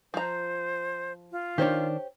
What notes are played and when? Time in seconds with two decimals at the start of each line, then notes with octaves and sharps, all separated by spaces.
0.14 F3 C5 A#5
1.32 F4
1.58 D#3 D4 G4 C5 C#5